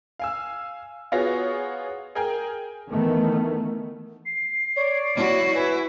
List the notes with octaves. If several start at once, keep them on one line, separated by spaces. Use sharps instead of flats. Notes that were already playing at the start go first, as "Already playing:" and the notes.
F5 G#5 E6
B3 F4 F#4 G#4 C#5 A#6
G#4 A#4 G5 G#5
D#3 E3 A3 B3
C7
C#5 D5
E4 F#4
E4 B4 G#5